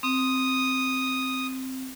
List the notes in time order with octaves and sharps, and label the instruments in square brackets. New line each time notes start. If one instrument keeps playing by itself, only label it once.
[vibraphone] C4 [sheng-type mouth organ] D#6